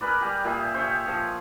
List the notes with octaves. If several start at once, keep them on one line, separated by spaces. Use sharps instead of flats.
G#4 A#4 B4 D5
G3 G4 G#4
A#2 G4 G#4 E5
C5 C#5 E5
F3 G#4